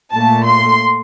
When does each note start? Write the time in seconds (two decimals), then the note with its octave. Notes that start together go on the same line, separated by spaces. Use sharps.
0.14 A#2 A3 A5
0.46 C6